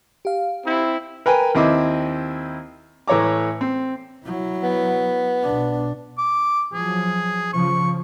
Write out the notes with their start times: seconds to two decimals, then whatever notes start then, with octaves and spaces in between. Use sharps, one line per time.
0.25 G4 F5
0.66 C4 E4
1.26 A#4 B4 G5 G#5
1.55 D#2 C4 E4 D#5 D6
3.08 A2 E3 C#5 A#5 D6
3.61 C4
4.25 F#3 E4
4.63 B3
5.43 B1 D4
6.18 D6
6.73 F3 F#3 G#4
7.53 C#3 F3 C#6